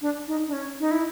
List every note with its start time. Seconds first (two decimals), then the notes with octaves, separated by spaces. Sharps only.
0.02 D4
0.28 D#4
0.47 D4
0.53 C#4
0.80 D#4
0.91 E4